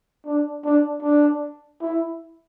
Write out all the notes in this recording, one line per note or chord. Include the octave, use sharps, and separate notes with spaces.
D4
D4
D4
E4